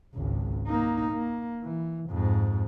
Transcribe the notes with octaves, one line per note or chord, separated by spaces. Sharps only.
G#1 C#2
A#3 D#4
A#3
E3
F2 G#2